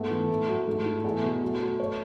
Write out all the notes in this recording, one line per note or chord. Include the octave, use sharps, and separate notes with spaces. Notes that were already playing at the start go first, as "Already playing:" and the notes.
Already playing: G#2 A3 B3
E3
A2
F#3
G#2 A3
E4
E2
B2
F#3 A3
F#3
C#5